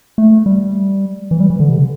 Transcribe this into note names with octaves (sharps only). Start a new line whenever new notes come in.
A3
G3
E3
G3
E3
D3
C3
D3